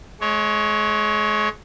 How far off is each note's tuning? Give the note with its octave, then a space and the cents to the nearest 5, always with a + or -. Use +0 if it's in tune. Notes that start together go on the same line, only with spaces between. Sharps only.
G#3 +35 C#5 +0